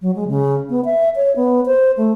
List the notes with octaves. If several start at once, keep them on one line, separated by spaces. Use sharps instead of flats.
F#3
G#3
C#3
B3
E5
C#5
B3
C5
A3